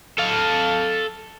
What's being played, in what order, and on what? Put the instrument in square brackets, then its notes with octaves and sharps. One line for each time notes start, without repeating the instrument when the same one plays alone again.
[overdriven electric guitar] A4 F5